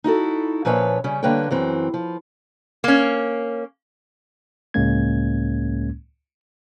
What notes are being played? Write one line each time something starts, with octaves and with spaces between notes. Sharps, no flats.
D#4 E4 F#4 A4
A#2 F3 C#4 B4 C#5 E5
C#3 G3 C#4
D3 G3 A#3 B4 C#5 G5
F#2 E3 C4
F3
A#3 C#4
C#2 A2 G#3 A#3 C#4 G#6